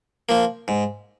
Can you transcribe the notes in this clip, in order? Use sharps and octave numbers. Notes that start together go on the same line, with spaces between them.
F3 A#3
G#2